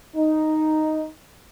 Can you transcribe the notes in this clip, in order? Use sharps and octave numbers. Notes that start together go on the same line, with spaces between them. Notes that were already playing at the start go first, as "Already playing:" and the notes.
D#4